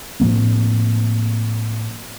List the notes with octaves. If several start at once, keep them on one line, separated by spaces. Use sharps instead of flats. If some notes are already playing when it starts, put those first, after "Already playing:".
A2 F3 A#3 C4